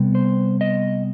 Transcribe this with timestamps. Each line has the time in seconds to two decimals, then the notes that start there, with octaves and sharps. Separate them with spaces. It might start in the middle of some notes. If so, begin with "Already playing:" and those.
Already playing: C3 G3 B3
0.15 C5
0.61 D#5